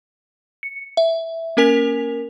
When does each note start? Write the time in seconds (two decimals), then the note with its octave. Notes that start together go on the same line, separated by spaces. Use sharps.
0.63 C#7
0.97 E5
1.57 A#3 C#4 A#4 G#5 B6 F7